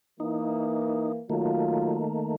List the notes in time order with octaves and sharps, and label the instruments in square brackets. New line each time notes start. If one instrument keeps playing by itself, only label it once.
[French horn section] E3 A#3 [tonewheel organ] D#4
[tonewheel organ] D#3 A3 A#3 [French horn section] F#3 F4